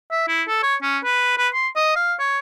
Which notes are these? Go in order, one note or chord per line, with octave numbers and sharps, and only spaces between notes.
E5
E4
A4
C#5
C#4
B4
B4
C6
D#5
F5
C#5